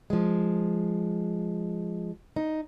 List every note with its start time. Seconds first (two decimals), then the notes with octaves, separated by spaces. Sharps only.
0.10 F3 G#3
2.36 D#4